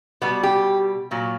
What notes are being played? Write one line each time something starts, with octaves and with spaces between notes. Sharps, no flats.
B2 G3 B3
G4
A#2 F#3